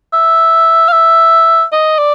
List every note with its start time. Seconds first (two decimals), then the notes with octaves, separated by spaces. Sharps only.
0.13 E5
0.88 F5
0.92 E5
1.72 D#5
1.98 D5